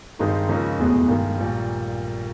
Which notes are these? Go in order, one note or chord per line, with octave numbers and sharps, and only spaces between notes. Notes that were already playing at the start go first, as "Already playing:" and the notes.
G2 D#3 G#3 C4 D#4
C#2 C#3 F3 A#3 D#4
F1 E2 B2 G#3 B3
G2 D#3 G#3
A#1 A#2 G3